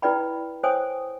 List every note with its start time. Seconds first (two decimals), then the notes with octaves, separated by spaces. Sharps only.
0.02 E4 B4 D5 G5 B5
0.63 C5 C#5 G5 G#5 D#6